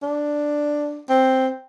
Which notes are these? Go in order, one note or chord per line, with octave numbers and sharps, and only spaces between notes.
D4
C4